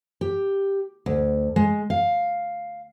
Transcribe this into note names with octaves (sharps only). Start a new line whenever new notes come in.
G4
D2
G#3
F5